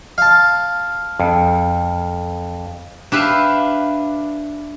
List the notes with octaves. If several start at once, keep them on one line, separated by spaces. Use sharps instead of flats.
F5 A5
F2
D4 G4 B4 E5 F5